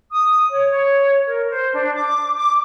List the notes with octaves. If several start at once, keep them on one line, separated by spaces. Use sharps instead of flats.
D#6
C#5
C#5
A#4
C5
D4
D6
D6